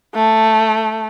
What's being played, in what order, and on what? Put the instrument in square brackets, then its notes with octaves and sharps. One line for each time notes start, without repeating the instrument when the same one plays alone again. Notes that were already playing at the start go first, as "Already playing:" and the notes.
[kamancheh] A3